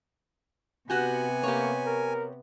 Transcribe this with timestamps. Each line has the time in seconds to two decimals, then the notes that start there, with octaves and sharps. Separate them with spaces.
0.90 C3 B3 F#4 G4 G#5
1.43 A#3 G4 C#5
1.86 A#4